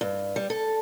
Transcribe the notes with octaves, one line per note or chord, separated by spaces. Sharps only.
G2
G3
A4